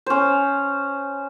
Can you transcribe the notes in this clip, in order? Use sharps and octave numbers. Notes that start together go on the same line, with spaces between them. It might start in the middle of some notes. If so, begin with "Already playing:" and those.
C#4 C5